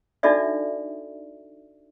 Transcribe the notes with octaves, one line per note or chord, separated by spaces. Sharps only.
D4 D#4 F#4 A4 D5 E5